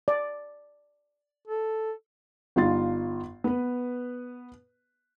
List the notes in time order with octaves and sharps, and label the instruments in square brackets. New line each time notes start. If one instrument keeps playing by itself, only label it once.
[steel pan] D5
[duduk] A4
[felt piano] G1 D#4 F4 C6 A6
B3 B4